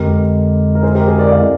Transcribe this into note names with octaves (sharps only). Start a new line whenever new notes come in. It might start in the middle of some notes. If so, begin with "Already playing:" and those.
Already playing: F2 D3 G#3 G4 A#4
A#4
G#4 C5
G4 A#4
G#4 C5
A#4 D5
D5 F5